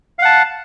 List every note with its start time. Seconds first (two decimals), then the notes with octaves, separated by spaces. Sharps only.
0.19 F5
0.22 F#5
0.25 A5